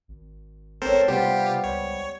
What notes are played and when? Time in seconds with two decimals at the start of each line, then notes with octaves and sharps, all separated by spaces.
0.08 G#1
0.82 A1 C4 A4 A#4 C5 C#5
1.08 C3 G3 B3 F4 G4 C5
1.64 C#2 C#5